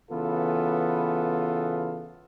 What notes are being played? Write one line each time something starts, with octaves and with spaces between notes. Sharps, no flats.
C#3 E3 B3 F4 A4 B4